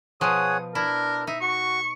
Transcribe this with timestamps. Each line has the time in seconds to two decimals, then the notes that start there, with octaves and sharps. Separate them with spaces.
0.21 B2 F3 G#4 C#5 F#5 D#6
0.75 D4 E4 A#4
1.27 D#4 E5
1.41 F#4 C#6